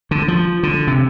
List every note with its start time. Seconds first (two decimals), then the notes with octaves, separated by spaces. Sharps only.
0.11 D3
0.28 F3
0.63 D3
0.87 C3